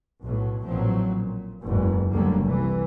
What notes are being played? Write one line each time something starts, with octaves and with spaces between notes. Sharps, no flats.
B1 A2 F#3
A1 A#2 F3 F#3 C4
A#2
F#1 E2 G#2
F1 D2 D3 F#3 G3 A#3
C2 E3